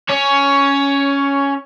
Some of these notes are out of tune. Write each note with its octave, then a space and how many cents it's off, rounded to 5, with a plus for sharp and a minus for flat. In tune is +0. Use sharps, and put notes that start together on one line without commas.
C#4 +5 C#5 +15